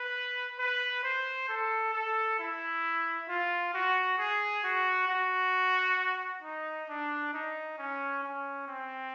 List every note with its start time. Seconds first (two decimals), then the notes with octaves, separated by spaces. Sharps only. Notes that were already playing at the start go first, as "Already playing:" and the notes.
Already playing: B4
0.58 B4
1.03 C5
1.49 A4
1.93 A4
2.39 E4
3.28 F4
3.74 F#4
4.18 G#4
4.64 F#4
5.08 F#4
6.43 D#4
6.89 D4
7.33 D#4
7.78 C#4
8.23 C#4
8.68 C4